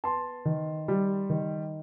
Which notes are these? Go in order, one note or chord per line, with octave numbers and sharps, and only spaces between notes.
B3 A5 C6
D#3
G3
D#3